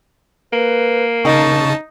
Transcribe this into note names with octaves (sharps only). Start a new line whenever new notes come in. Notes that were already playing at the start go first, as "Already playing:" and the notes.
A#3 B4
C#3 D#4 A5 C#6